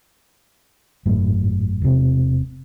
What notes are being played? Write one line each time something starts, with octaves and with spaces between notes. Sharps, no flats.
G#1 F#2 A2
E1 C3